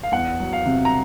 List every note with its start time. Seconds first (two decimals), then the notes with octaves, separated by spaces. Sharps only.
0.03 F5
0.12 E2 F#5
0.40 F#3
0.53 F5
0.66 C3
0.85 A#5